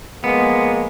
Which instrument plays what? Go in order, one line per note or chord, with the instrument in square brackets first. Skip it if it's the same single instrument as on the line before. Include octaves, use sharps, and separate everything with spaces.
[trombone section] F3 G#3 A#3 [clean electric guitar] B3